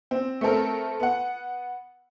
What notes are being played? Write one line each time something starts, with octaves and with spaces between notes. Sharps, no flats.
C4
A3 B3 C4 A4 A#4
B3 F#5